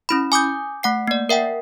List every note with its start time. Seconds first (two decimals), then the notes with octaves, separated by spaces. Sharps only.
0.09 C#4 E4 B5
0.32 G#5 D6 D#6 G6
0.83 A3 F#5 C7
1.08 A#3 D5
1.29 A#4 E5 F#5 G5